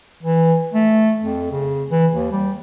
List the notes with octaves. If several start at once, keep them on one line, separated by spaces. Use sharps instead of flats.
E3
A3
F2
C#3
E3
D#2
G3